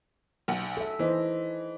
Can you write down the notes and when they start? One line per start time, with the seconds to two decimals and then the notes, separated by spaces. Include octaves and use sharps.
0.48 B1 F#5
0.77 A4 E5
0.99 E3 D#4 C5 D#5